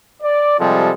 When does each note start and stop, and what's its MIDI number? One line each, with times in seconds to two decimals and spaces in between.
0.23 0.56 74
0.59 0.92 48
0.59 0.92 53
0.59 0.92 55
0.59 0.92 56
0.59 0.92 69